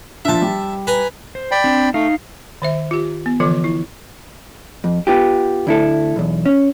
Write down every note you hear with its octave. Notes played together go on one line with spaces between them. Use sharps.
F3 D4 E5 A5
G3
B4 G#5 A#5
C5
D5 G5 B5
C4 D4
A3 D#4 F5
D#3 C5 E5
F4 G4
B3
D3 E3 F3 F4 A4
E4
F2
B3 F4 G4
D2 E4 A4
B1 E2
C#4